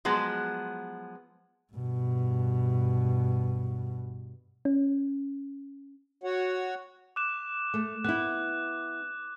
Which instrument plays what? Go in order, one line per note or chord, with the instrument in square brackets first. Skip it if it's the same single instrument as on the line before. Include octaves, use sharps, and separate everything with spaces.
[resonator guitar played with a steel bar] F3 F#3 G#3 B3
[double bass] G2 B2
[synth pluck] C#4
[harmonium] F#4 C#5 F#5
[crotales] D6 F#6 E7
[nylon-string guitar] A3
[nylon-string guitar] B3 E4 [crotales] F#6